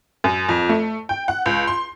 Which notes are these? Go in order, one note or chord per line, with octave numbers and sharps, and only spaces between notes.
F#2
F2
A3
G5
F#5
C#2
C6